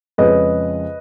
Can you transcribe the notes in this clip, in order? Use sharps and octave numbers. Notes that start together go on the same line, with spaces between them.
F2 C#3 G#3 C#4 B4 D#5